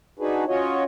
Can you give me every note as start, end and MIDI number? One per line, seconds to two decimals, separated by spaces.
0.19 0.44 62
0.19 0.44 63
0.19 0.44 66
0.19 0.44 68
0.19 0.44 71
0.48 0.84 61
0.48 0.84 65
0.48 0.84 66
0.48 0.84 73
0.48 0.84 75